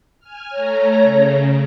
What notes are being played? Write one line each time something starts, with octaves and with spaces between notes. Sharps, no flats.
G#5 F6
A3 C#5 A#5
C#3